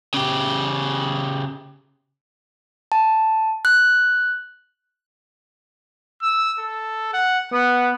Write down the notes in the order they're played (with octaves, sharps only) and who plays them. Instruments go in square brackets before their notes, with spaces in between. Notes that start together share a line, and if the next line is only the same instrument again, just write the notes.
[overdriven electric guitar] C#3 G4
[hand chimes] A5
F#6
[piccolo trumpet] E6
A4
F#5
[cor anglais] B3 [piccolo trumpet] F#5